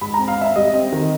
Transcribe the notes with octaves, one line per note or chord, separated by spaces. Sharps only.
G#2 B5
C4 A#5
F5
C4 E5
G3 D#5
C4
D#3